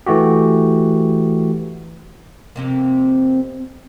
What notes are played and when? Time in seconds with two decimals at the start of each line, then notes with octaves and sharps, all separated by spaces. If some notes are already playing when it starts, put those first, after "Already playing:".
0.06 E3 A3 F#4 G4
2.56 F2 C3 A#3